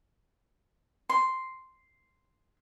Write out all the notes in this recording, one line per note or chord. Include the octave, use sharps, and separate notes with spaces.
C6